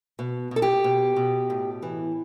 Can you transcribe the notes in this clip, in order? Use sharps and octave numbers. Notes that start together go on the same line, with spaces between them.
B2
B2 A4
G4
B2
B2
A2
E3